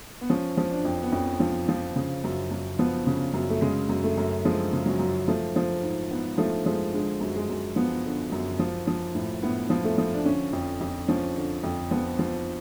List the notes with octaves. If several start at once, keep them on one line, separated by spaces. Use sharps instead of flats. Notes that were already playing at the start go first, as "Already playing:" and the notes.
B3
F3 C#4
F3
D4
F2
B3
F2 C#4
F3
F3
C#3
F#2
F#2
F3 B3
C#3
F#2
A3
C#3 G#3
F#2
A3
F#2
F3 G#3
C#3
F#3
F#2
F3 A3
F3
G#2
G#2 B3
F3 A3
F3 G#3
D3 G#3
F#2
G#3
F#2
F3 B3
D3
F#2
F3
F3
A2
A2 B3
F3
A3
F3
D4
D3 C#4
F2
F2
F3 C#4
D3
F2
F3 B3
F3